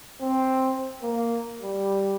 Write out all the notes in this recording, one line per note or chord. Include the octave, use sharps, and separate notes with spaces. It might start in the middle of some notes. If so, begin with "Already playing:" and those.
C4
A#3
G3